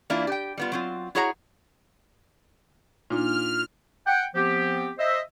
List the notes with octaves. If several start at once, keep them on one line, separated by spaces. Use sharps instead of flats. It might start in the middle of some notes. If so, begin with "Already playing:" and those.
E3 A#3 D4 E4 F4
G4 G5
G3 B3 F4
F#3 C4 F4
E4 F#4 G#4 C#5 F#5 A#5
A#2 A#3 D4 D#4 F6
F#5 G5
F3 B3 C4 G4
C5 D#5 E5